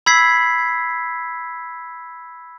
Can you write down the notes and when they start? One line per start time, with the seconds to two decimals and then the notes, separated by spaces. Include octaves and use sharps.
0.06 B5 E6 G#6 B6 C7